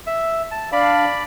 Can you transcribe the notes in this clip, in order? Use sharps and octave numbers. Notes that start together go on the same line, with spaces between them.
E5
A5
D4 D5 F5 B5